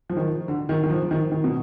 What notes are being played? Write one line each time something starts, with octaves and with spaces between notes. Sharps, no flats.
F3
D#3
D3
D#3
D#3
F3
D#3
D#3
B2